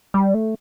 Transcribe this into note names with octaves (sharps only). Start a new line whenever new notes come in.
G3
A3